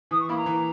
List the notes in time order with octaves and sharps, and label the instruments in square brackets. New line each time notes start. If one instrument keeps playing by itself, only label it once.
[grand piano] E3 [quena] D#6
[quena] C#6
[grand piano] A#3 E4 [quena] B5
[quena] A#5
[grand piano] E3